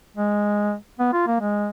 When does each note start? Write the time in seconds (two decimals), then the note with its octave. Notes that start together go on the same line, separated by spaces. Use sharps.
0.17 G#3
0.99 B3
1.13 F4
1.27 A#3
1.41 G#3